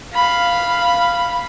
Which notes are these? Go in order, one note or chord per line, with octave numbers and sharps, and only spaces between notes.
F5 B5